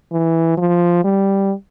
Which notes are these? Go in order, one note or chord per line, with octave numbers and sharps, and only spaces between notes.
E3
F3
G3